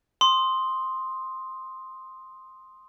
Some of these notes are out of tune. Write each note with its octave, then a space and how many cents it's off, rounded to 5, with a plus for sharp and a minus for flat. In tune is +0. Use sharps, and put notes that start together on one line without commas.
C6 +5 D#6 +0